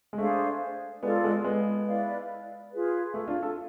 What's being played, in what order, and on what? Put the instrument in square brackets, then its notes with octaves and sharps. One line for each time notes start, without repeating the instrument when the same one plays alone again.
[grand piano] G#3
[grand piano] A3 [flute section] D4 G#4 C5 F5
[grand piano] G#3 B3 [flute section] F4 A4 D5
[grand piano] G#3 B3
G#3 B3
[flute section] E4 B4 D5 F5
F4 G#4 B4
[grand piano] A3
D4 F4
F4 A4